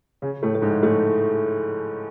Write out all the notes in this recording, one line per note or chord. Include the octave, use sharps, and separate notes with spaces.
C#3 C#4
A2 A3
A3
G#2 G#3
A2 A3